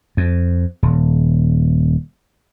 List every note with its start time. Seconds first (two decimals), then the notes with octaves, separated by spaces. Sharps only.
0.17 F2
0.83 D#1